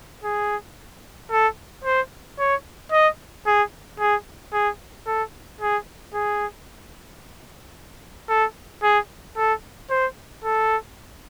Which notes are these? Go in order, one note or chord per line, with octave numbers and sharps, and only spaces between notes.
G#4
A4
C5
C#5
D#5
G#4
G#4
G#4
A4
G#4
G#4
A4
G#4
A4
C5
A4